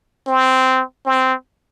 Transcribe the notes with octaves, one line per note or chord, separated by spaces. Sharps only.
C4
C4